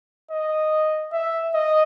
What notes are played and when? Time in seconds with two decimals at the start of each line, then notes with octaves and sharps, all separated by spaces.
0.31 D#5
1.13 E5
1.54 D#5